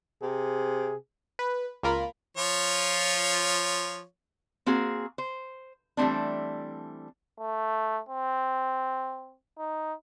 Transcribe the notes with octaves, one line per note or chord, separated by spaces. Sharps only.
C3 G#4
B4
C#2 A#3 F4 A#4 B5
F3 F4 C#5
A#3 C4 F#4 G#4
C5
E3 G3 A3 C4 D4
A3
C4
D#4